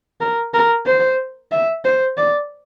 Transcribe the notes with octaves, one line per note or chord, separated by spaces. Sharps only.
A#4
A#4
C5
E5
C5
D5